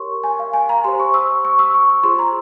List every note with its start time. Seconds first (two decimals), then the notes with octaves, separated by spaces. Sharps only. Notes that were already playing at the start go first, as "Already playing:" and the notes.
Already playing: G4 A#4 C#5 C6 C#6
0.24 G#5
0.39 F5
0.54 G#5
0.69 A#5
0.84 G4 C5 C6
1.00 C#6
1.14 E6
1.45 C#6
1.59 E6
1.74 C#6
1.90 C#6
2.03 F4 G#4 C5 C6
2.19 A#5